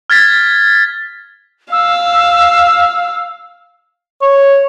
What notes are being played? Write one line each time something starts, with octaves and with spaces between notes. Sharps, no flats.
F6 G#6 A6 B6
F5 E6
C#5